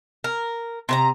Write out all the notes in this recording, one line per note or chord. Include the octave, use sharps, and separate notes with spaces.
A#4
C3 B4 A#5